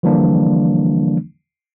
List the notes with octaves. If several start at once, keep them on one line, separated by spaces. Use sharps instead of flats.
D3 E3 F3 G3 A#3 D4